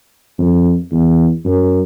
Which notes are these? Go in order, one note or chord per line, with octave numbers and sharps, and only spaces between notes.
F2
E2
F#2